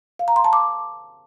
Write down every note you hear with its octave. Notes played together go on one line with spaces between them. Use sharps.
F5
A#5
C6
A5
D6